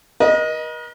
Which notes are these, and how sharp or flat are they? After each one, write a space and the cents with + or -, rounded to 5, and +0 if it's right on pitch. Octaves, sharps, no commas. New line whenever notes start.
A#4 +45 D#5 +0